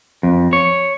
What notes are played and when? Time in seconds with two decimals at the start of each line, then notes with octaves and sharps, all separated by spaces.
0.23 F2
0.53 C#5